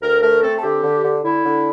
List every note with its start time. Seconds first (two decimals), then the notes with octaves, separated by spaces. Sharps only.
0.02 D2 A#4
0.22 A3 A#4
0.42 C4 A4
0.58 A4
0.63 D3 G4
0.83 D3
1.04 D3
1.24 D3 E4
1.45 D3